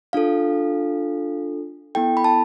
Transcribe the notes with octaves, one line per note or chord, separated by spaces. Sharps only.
D4 F4 A4 F5
B3 E4 A4 G5
B5
A5